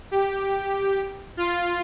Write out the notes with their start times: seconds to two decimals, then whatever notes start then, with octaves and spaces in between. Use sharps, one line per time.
0.11 G4
1.37 F4